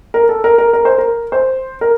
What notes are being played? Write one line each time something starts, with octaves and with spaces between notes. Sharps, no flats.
A#4
A4
A#4
A#4
A#4
C5
A#4
C5
A#4